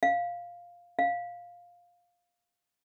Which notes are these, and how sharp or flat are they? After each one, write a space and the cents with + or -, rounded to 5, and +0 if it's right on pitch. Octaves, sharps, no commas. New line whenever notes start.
F5 +5
F5 +10